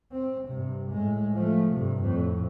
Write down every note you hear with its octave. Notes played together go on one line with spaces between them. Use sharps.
C4
G2 C3
A2 G#3
F3 A3
G2 C3
F2 A2